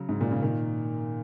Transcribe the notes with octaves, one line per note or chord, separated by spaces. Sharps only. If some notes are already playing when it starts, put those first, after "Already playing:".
Already playing: C#3 F#3
G#2
A#2
C#3
A#2 D#3